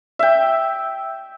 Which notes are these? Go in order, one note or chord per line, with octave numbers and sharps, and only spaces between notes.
E5 G5